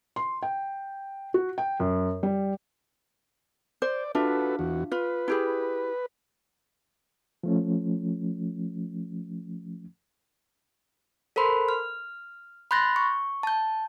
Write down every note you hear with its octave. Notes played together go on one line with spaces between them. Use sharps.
C6
G5
F#4
G5
F#2
G3
C5 D5
D4 F4 F#4 A4 B4 E5
E2 F#4
F4 B4
E4 G4 G#4
F3 A3 C#4
A4 A#4 C5 B5 C6
F6
B5 C6 F#6 G6 A6 A#6
C#6
A5 G6